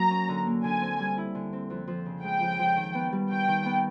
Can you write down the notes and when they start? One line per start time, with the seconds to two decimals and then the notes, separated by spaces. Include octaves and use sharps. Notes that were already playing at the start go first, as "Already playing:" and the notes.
Already playing: F#3 A#3 A#5
0.11 C#4
0.29 D3
0.47 A#3
0.64 D3 G#5
0.82 C4
1.00 G3
1.18 E4
1.35 D3
1.53 C4
1.70 F2
1.88 F3
2.06 C#3
2.23 G#3 G5
2.42 F2
2.59 F3
2.76 D#3
2.95 B3
3.12 G3
3.30 D#3 G5
3.48 D#3
3.65 B3